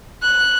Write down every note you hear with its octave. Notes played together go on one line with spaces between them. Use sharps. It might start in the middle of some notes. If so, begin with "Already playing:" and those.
F#6